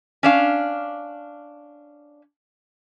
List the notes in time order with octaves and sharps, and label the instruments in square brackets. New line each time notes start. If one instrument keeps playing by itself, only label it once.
[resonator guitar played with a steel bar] C#4 D4 F5